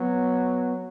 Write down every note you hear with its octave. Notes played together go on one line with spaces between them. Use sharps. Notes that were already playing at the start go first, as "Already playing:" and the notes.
Already playing: F#3 B3